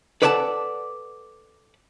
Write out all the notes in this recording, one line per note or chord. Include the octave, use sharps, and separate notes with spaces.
A4 B4 D5 F#5 G#5 A5